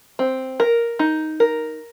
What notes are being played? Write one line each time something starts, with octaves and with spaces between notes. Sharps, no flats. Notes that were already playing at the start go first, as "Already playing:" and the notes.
C4
A#4
D#4
A#4